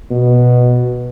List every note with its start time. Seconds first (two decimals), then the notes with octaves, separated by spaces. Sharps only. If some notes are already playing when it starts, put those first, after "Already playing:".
0.11 B2